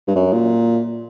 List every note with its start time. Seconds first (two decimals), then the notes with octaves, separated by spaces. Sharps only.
0.08 G2
0.15 F#2
0.33 A#2